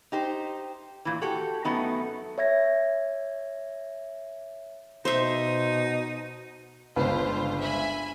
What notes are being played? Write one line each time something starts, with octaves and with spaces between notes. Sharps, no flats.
D#4 G4 C5
A#2 E3
F#4 G4 A4 G5
F#2 A3 B3 D#4
C#5 E5 G#6 A#6
B2 D#4 C5 E5
G1 C#2 F4 B4 C5
E5 G#5 B5